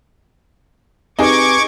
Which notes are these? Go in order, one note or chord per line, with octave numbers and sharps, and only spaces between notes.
C4 D#4 G4 G#4 B4 C#6 D6 G#6